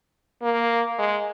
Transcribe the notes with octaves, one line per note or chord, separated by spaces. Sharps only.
A#3
G#3